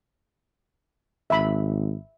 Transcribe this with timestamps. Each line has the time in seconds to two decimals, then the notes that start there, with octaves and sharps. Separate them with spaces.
1.30 G#1 E5 B5